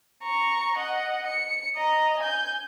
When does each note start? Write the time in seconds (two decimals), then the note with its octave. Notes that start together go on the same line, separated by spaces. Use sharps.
0.22 A#5 C#6
0.78 D#5 F#5
1.27 C#7
1.77 D#5 A#5
2.19 G#5 G6